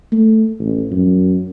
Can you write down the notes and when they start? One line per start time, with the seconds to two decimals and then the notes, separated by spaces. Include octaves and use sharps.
0.12 A3
0.59 A1
0.91 F#2